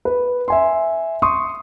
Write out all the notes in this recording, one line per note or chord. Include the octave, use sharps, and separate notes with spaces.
B4
E5 G#5 C6
C6 C#6 D#6